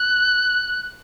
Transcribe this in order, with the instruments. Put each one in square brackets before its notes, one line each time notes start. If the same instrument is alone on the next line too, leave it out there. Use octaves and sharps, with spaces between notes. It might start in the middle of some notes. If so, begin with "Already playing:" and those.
Already playing: [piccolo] F#6